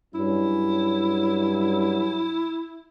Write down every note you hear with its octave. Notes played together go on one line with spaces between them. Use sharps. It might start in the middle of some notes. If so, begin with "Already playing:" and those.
G2 F#3 C#4 E4